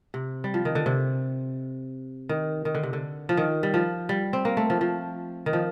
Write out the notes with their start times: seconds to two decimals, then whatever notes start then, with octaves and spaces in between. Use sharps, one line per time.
0.14 C3
0.44 G3
0.54 F3
0.65 D#3
0.75 D3
0.86 C3
2.29 D#3
2.65 D#3
2.75 D3
2.83 C3
2.93 D3
3.29 F3
3.37 D#3
3.63 G3
3.74 F3
4.09 G3
4.33 C4
4.45 A#3
4.57 A3
4.70 F3
4.81 F3
5.46 D#3
5.53 F3